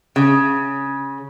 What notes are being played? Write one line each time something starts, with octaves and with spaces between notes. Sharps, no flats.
C#3